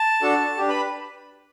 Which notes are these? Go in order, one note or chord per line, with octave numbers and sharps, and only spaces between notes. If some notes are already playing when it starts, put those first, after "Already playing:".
Already playing: A5
D4 F#4 A4
D4 G4
B4 B5